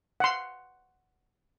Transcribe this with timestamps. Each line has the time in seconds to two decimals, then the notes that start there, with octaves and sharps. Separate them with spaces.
0.20 F#5 C6